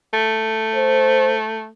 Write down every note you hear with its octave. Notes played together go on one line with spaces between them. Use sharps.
A3
C5